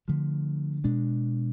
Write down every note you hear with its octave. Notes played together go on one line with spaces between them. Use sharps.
D3 F3 A3
B2 G#3 D4